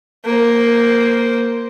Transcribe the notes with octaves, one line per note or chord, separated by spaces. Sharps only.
A#3 C5